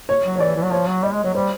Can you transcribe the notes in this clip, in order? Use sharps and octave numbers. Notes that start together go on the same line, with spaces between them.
C#5
F#3
C#5
E3 D5
E3
F#3
F3 C#5
F#3
G3 D#5
G#3
F#3 C#5
G3 C5